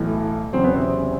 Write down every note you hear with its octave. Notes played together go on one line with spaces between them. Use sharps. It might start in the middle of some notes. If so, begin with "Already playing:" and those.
Already playing: B1 A2 E3
E2 C#3 F#3 C4
B3
C3 C4